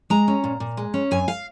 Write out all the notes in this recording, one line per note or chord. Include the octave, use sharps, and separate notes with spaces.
G#3 A#5
C#4
A#2
A#2
G#3
C#4
F#2 G#5
F5